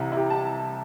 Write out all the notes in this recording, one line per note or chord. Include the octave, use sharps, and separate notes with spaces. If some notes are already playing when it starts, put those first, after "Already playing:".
Already playing: C2 C3 E3 E4
E4
G4
A5